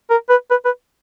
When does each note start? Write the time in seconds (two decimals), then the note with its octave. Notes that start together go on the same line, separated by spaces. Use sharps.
0.10 A#4
0.30 B4
0.51 B4
0.65 B4